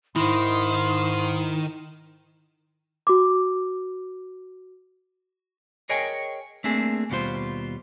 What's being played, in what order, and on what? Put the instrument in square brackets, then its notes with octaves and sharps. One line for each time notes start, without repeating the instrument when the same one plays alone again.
[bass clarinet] G#2 [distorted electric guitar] D#3 [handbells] E4 [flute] C6
[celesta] F#4 D6
[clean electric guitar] G#4 A#4 C#5 D#5 G5 G#5
A3 A#3 C4 D4 G#4
D#2 B2 G3 F4 C5